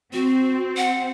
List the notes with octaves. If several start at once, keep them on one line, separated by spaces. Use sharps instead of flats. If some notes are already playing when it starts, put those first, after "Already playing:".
C4 F#4
F#5